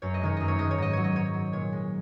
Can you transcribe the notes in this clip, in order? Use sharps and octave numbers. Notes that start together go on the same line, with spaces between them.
F#2 C#5
D#5
D#3 G#3 C#5
F#2 D#5
C#5
D#3 G#3 D#5
C#5
G#2 D#5
F#3 C#5
D#5
G#2 C#5
F#3
A#2 C#5
G#3